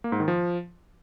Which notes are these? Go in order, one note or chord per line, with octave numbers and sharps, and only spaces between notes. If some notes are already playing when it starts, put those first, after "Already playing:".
A#3
G#2
D#3
F3